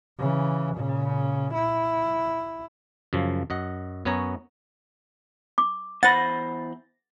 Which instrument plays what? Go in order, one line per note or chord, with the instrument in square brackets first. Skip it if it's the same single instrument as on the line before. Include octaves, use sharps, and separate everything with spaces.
[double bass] C#3 E3
A#2 C#3
E4
[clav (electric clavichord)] F#2 C#3 F3
F#2 D#5 F#5
F#2 B3 F#4 C#5 G#5 A#5
[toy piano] D6
[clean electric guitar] E2 C5 B5 [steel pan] F#5 [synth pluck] A6 A#6